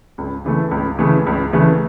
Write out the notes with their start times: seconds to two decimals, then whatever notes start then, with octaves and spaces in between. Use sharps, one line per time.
0.18 C#2
0.45 C#3 E3 A3
0.71 C#2
0.99 C#3 E3 A3
1.27 C#2
1.53 C#3 E3 A3